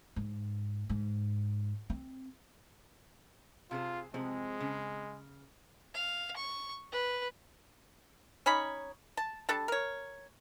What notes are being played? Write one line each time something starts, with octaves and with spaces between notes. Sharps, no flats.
G#2
G#2
C4
C3 F4 G#4 C5
C3 F3 G#3 C4 G#4
C#3
F5
C#6
B4
C#4 D#4 C#5 B5
A5
G3 D4 A4 A5
A#4 C#5